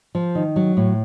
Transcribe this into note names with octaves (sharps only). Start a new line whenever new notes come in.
F3
D#3
F#3
A2